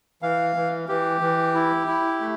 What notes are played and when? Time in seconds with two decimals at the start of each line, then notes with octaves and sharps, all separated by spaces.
0.22 E3 F5
0.56 E3
0.89 E3 G4
1.21 E3
1.54 E4
1.87 E4
2.20 A3